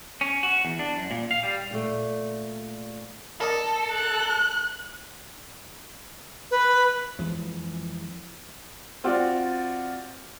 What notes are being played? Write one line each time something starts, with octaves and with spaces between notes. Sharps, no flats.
C#4
F#4
E2
D4
F#2
A#2
F5
G3
A#2 A3
A4 A#4 D5 D#5
F#6
B4
F2 E3 F3 G#3
C4 F4 F#4 D5